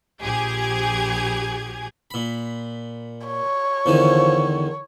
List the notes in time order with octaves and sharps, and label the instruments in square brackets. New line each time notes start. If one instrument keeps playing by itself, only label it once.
[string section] A#1 G4 G#4 G#6
[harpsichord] A#2 B5
[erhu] C#5
[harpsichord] E2 D3 D#3 [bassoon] F3